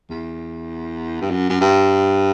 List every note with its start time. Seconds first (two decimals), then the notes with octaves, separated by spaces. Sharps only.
0.10 E2
1.21 G2
1.31 F#2
1.50 F#2
1.61 G2